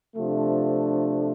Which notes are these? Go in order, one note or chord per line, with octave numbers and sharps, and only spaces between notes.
C3 F3 A3 D4